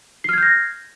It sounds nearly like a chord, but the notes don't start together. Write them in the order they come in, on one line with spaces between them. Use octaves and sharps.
C7 F6 G#6 G6 A#6